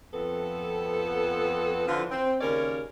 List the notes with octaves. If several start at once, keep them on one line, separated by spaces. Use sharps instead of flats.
F2 B3 A4
D3 E3 F3 F4
C4
D#2 C#3 C#4 A#4 C#5 D5